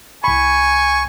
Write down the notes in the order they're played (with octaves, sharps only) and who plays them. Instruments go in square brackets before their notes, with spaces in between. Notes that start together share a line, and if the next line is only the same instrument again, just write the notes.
[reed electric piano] C2 B5 [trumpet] G#5 [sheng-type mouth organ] C#6